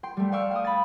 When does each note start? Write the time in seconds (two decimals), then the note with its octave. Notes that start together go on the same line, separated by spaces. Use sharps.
0.03 G5 C6
0.17 G3 A3
0.32 D5 F5 G5 C#6 E6
0.51 F5 G5 D#6
0.64 B5 A6